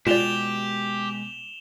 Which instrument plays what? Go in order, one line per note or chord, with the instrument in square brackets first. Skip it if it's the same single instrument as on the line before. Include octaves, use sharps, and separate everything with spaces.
[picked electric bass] B2 G#3 [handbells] F4 D5 [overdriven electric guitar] G4 [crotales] E7 F7 G7